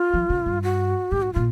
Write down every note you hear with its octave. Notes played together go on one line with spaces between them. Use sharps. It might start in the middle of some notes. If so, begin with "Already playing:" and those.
Already playing: F4
F3
C#3
G2
F#4
G#2 G4
F#4
A#2 F4